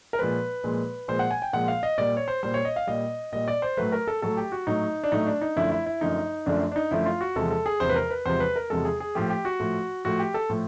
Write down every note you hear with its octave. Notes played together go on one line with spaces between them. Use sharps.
A#4
A#2 F3 G#3 B4
A#2 F3 G#3
A#2 F3 G#3 C5
F#5
G#5
G5
A#2 F3 G#3 F#5
F5
D#5
A#2 G3 D5
C#5
C5
A#2 G3 C5
C#5
D#5
F5
A#2 G3 D#5
A#2 G3 D#5
D5
C5
A2 F#3 A3 B4
A#4
A4
A2 F#3 A3 A4
G4
F#4
A2 F#3 A3 D#4
D4
A2 F#3 A3 D#4
D4
D#4
F#2 D3 F3 A3 E4
E4
E4
F#2 D3 F3 A3 D#4
F#2 D3 F3 A3 D4
D4
D#4
F#2 D3 F3 A3 E4
F4
F#4
E2 C3 F3 G#3 A4
A4
G#4
E2 C3 F3 G#3 C5
B4
A#4
B4
E2 C3 F3 G#3 C5
B4
A#4
E2 C3 F3 G#3 A4
G#4
G#4
A2 F3 A3 G4
G4
F#4
A2 F3 A3
A2 F3 A3 F#4
G4
A4
A2 F3 A3